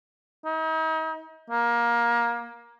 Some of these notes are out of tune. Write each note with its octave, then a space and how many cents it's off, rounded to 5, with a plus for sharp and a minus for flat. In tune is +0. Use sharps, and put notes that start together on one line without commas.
D#4 +40
A#3 +20